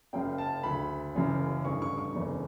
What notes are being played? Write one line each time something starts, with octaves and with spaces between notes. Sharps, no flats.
F#1 F#2 C#3 G5
A5
D2 D3 B5
F#1 F#2 C#3 E3
A1 G2 D3 C#6
C#6
C#6
F#1 E2 D3